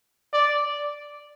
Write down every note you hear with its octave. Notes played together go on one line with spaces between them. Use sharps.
D5